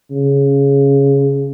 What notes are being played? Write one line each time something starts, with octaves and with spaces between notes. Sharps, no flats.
C#3